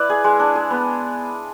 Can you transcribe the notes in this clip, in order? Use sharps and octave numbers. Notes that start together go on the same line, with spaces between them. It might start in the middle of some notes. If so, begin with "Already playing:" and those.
Already playing: E4 B4 D5
G#4
G#3
D4
G#4
B3